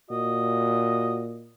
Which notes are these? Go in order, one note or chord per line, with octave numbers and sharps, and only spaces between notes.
A#2 F#4 D#5